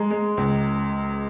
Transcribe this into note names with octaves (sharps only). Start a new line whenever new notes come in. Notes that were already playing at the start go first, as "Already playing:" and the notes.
Already playing: G#3 A#5
G#3
C#2